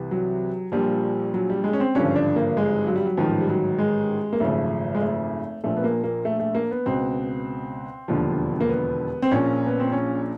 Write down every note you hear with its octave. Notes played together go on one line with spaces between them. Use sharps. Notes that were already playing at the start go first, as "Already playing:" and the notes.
Already playing: C2 C3 E3
F#3
A#1 A#2 F3 G3
F#3
G3
G#3
C#4
C4
G#1 G2 D3 F3 C#4
D4
A#3
G#3
F#3
G3
F#3
A1 G#2 D#3 F3
G3
F#3
G#3
A#3
G#1 F#2 C#3 F3 A3
G#3
A3
A#1 A#2 F3 A3
B3
A#3
A#3
A3
A3
A#3
B3
C#2 B2 C4
E1 D#2 D3 F3
A#3
B3
C4
A#1 A#2 F3 C#4
B3
C4
C#4